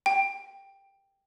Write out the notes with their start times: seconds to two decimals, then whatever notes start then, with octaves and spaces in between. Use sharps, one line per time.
0.06 G5